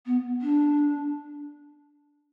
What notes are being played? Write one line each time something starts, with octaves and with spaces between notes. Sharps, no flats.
B3
D4